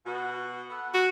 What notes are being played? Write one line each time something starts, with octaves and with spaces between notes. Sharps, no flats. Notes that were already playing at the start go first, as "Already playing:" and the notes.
B2 F#4
B3 A4 F#5
F#4